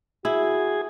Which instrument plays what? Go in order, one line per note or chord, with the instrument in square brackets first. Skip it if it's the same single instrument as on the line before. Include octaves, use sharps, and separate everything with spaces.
[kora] E4 [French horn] F#4 [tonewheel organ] G#4